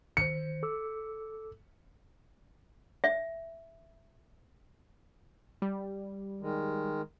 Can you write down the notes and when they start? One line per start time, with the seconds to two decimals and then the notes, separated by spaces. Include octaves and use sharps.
0.17 D#3 C5 C#7
0.63 A4 D6 E6
3.04 E5
5.62 G3
6.41 D#3 G#3